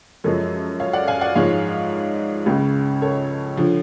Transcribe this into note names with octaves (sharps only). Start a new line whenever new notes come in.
F#2 F3 G#3 A4 C#5
C#5 F5
D5 F#5
F5 G#5
D5 F#5
G#2 F3 G#3 C#5 F5
C#2 C#3 G#3
A4 C#5
D3 F3